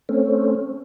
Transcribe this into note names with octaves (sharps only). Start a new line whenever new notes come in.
A3 C4 C#4